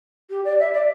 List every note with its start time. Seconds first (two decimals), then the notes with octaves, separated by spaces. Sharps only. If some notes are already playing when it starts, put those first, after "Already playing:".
0.30 G4
0.44 D5
0.59 E5
0.73 D5